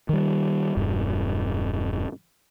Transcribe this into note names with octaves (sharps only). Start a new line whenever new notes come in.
D#3 G3
E1 G2